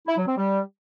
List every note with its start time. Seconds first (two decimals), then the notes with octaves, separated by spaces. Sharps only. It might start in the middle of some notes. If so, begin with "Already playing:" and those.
0.08 E4
0.18 F#3
0.28 C4
0.37 G3